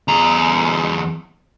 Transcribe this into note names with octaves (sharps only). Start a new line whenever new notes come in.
E2 A#5